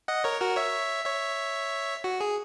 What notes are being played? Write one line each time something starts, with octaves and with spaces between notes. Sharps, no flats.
D#5 F#5
A#4 C#5
F#4 A#4
C#5 E5
C#5 E5
F#4
G#4